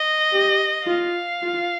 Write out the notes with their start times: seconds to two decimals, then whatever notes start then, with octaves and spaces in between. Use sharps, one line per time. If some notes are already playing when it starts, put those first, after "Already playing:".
Already playing: D#5
0.32 G4
0.87 F4 F5
1.42 F4